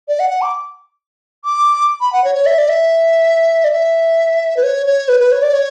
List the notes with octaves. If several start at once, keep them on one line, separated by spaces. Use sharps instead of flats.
D5
F#5
F#5
D6
D6
B5
F#5
C#5
C#5
E5
D5
E5
D5
E5
B4
C#5
C#5
B4
B4
C#5
D5
C#5